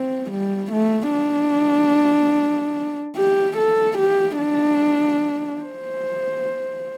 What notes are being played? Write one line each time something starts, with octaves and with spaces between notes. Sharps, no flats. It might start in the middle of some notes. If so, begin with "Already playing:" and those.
Already playing: C4
G3
A3
D4
G4
A4
G4
D4
C5